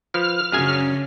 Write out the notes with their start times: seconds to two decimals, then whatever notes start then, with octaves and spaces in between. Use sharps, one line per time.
0.14 F3 B4 F6
0.52 F#2 C#3 C#4 D4 G#4 G#5